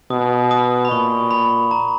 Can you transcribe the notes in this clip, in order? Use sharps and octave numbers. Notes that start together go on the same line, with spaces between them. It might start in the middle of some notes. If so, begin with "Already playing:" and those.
B2 D#6
D#6
B5
A#2 C#6
B5
A#5